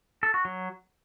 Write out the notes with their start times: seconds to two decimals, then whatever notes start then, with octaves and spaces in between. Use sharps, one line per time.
0.23 A4
0.34 F#4
0.45 F#3